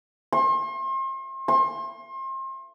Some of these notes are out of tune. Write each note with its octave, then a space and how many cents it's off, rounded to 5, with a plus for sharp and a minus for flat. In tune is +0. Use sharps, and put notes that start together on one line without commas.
C6 +40
C6 +35